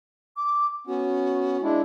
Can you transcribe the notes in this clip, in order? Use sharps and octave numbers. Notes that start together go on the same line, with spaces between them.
D6
B3 C#4 F#4
G#3 D4 E4